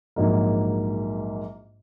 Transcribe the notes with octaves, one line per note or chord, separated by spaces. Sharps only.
A#1 G#2 F#3 A#3